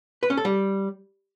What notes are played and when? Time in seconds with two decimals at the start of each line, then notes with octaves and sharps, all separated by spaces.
0.23 B4
0.30 C#4
0.37 A4
0.45 G3